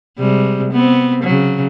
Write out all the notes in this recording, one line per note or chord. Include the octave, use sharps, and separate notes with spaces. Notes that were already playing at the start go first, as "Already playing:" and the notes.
C3 G3 G#3
B3 C4
C#3 F#3